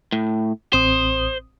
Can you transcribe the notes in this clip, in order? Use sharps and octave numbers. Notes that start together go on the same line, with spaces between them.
A2
A1 C4 C5 D#6